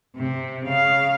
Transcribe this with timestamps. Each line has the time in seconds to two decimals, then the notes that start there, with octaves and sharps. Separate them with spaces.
0.17 C3
0.64 C#3 F5